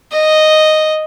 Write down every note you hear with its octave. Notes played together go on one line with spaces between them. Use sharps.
D#5